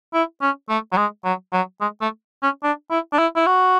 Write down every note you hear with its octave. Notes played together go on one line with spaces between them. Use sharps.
E4
C#4
A3
F#3
G#3
F#3
F#3
G#3
A3
C#4
D4
E4
D4
E4
E4
F#4